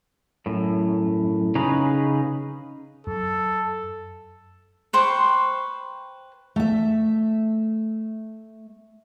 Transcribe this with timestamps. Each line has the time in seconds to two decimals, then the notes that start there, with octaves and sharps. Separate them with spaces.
0.46 F#2 A2
1.55 C#3 C#4 D#4 G#4 B4 A#5
3.07 F#2 A4
4.93 B4 C5 G5 C#6
6.56 A3 E5